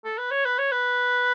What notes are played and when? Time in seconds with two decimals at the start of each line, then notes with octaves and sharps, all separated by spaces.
0.05 A4
0.18 B4
0.31 C#5
0.45 B4
0.59 C#5
0.72 B4